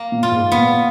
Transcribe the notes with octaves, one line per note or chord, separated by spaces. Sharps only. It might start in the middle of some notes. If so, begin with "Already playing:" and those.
Already playing: A#3
A#2
F4
G#2
A#2 B3